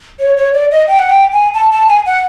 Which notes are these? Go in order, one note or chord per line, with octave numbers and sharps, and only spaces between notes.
C#5
C#5
D5
D#5
G5
F#5
G5
G#5
A5
A5
G#5
F#5